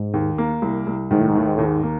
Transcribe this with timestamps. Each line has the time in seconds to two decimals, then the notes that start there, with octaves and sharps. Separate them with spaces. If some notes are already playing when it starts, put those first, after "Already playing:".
Already playing: G#2
0.14 D#2
0.38 A#3
0.62 C2
0.87 C2
1.11 G#2 D#3
1.20 A2
1.29 G#2
1.35 D#2 A2
1.47 G#2
1.57 D#2 A2
1.65 G#2
1.83 A#3